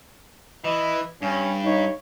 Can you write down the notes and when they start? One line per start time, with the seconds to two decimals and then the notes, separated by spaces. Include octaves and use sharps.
0.64 E3 D#5
1.22 G2 C#4
1.65 D#4 C#5